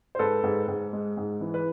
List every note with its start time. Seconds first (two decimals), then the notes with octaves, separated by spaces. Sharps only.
0.15 C5
0.19 G#2 A4 B4
0.43 G#2
0.68 G#2
0.93 G#3
1.17 G#2
1.41 E3
1.54 B4